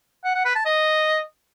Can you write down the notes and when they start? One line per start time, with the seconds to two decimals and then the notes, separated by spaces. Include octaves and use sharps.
0.24 F#5
0.35 F#5
0.45 B4
0.55 A5
0.65 D#5